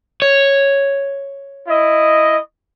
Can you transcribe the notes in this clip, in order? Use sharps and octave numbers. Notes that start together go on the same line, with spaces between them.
C#5
E4 D#5